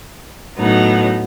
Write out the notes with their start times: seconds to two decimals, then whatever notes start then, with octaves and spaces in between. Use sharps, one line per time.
0.56 A2 F#3 B3 D#4